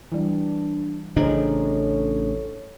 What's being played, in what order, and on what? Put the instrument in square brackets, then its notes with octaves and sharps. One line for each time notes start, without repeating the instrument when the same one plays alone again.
[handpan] E3 G3 [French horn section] D4
[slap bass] A1 C#3 D4 [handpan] D#4 G#4 C5 [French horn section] A4 C#5